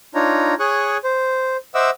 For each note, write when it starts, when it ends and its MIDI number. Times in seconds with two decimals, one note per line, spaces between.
0.15 0.55 62
0.15 0.55 63
0.15 0.55 65
0.15 0.55 73
0.15 0.55 82
0.60 0.97 68
0.60 0.97 73
0.60 0.97 85
0.60 0.97 87
0.60 0.97 90
1.04 1.57 72
1.75 1.90 72
1.75 1.90 75
1.75 1.90 76
1.75 1.90 78
1.75 1.90 86
1.75 1.90 88